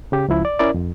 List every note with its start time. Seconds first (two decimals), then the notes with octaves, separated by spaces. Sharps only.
0.12 C#3 G4
0.28 C#2 F3 E4
0.45 D5
0.59 C#4 E4 A#4 D5
0.74 F2